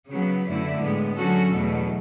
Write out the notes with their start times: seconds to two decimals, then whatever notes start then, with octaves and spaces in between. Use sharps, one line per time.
0.10 C#3 F#3 B3
0.46 F#2 D3 A3 E4
0.81 A2 G#3 B3
1.16 D3 F#3 C#4 F#4 A4
1.52 E2 B2 F#3 A3